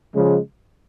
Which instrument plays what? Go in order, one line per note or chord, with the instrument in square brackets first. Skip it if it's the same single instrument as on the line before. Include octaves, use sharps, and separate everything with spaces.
[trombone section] C#3 F3 G#3